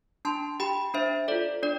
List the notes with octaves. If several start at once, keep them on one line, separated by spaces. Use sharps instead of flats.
D4 A5 C6
G4 G5 B5
D4 C5 E5
F4 A4 D5
D4 D5